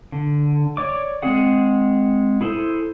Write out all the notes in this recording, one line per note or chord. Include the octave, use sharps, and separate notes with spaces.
D3
C#5 D5 D6
G#3 C4 G#4 F#5
E4 G#4 A4 C5